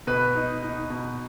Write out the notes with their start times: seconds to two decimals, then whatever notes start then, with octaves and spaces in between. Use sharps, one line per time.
0.07 B2 B4
0.35 D#4
0.63 D#4
0.90 B2